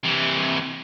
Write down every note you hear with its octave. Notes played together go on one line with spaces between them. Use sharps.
C3 E3